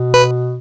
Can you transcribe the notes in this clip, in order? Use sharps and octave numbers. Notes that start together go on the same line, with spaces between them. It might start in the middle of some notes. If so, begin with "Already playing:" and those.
Already playing: B2
B4